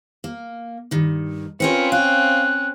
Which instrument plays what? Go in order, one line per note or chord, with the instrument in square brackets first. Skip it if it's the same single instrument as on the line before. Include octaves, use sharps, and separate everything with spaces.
[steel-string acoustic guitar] A#3
G2 D#3
[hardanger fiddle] C4 C#4 [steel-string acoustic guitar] F4 A#4 B4 [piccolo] C#7
[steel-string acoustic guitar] F5 [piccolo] F#6